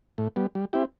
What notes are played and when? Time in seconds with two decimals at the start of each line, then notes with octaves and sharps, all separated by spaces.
0.18 A2
0.36 G3 B3
0.55 G3
0.73 C4 E4 G4